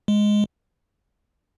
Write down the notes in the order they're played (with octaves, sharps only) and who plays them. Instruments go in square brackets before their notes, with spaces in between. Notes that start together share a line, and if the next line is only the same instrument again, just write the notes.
[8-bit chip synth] G#3